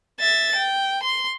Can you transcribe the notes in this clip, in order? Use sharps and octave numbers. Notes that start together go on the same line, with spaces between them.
E5 A6
G5
C6